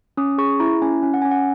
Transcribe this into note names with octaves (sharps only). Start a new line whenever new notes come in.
C#4 D#6
G#4 C#6
E4 A#5
C#4 G#5
C#4
F#5
G#5
C#4
F#5